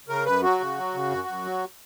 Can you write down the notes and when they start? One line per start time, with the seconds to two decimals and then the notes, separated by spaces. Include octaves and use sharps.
0.08 C#3 A#4
0.26 F#2 B4
0.43 F#3 F#4
0.60 C#3
0.77 F#3
0.94 C#3
1.11 F#2
1.28 F#2
1.45 F#3